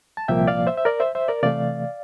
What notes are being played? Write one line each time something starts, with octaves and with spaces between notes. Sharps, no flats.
A5
C2 A#2 F3 A#3 E5 G5
D5 F5
C5 E5
E5
A#4 D5
C5 E5
C5 E5
A#4 D5
C3 E3 A3 D5 F5